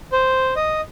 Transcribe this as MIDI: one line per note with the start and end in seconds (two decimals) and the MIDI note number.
0.12 0.54 72
0.56 0.81 75